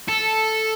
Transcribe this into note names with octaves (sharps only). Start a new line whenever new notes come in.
A4